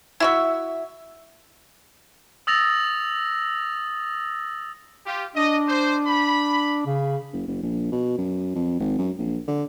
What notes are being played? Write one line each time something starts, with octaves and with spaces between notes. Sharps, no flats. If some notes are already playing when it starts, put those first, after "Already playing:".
E4 F#4 E5
D#6 E6 A6 A#6 F7
F4 G4
D4 D#5
C5
B5
C#3
F#1
F#1
A#1
B2
F#2
F2
G#1
F#2
A#1
D3